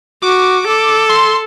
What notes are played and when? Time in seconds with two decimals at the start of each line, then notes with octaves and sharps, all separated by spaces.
0.22 F#4 D6
0.67 A4
1.09 C6